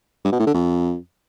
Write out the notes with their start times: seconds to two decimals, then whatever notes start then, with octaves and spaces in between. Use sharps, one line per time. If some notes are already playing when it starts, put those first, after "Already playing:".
0.25 G2
0.32 B2
0.39 A2
0.47 D3
0.54 F2